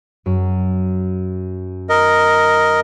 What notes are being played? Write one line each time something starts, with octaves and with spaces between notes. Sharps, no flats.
F#2
A#4 D#5